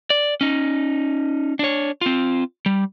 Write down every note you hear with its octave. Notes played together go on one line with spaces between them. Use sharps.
D5
C#4 D#4
D4 C#5
C4 F4
G3